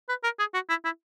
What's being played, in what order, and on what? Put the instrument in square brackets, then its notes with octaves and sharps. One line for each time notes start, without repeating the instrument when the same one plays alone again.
[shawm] B4
A#4
G#4
F#4
E4
E4